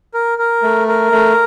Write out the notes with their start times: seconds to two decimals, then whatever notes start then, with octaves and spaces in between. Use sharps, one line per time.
0.14 A#4
0.38 A#4
0.63 A3
0.88 A#4
1.12 A3